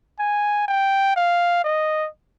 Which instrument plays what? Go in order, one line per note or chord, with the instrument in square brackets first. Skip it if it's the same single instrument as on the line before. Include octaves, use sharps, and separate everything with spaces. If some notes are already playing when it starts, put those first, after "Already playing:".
[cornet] G#5
G5
F5
D#5